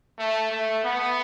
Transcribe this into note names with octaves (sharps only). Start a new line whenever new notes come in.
A3
A3
B3